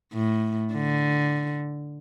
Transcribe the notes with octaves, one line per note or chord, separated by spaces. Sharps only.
A2
D3